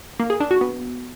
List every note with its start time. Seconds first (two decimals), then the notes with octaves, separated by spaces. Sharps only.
0.20 A#3
0.30 G#4
0.40 D4
0.51 F#4
0.61 B3